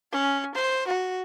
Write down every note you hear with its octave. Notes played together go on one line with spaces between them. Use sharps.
C#4
C5
F#4